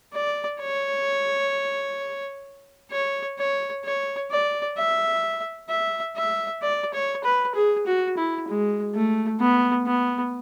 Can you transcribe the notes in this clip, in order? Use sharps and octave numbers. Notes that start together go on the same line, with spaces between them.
D5
C#5
C#5
C#5
C#5
D5
E5
E5
E5
D5
C#5
B4
G#4
F#4
E4
G#3
A3
B3
B3